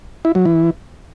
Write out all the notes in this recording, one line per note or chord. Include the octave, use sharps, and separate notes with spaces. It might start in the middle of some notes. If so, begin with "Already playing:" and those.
E4
F#3
E3